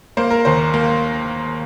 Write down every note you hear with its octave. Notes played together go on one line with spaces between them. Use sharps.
A#3 C5
A#4
D#2 C5
A#3